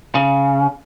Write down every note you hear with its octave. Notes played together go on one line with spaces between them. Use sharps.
C#3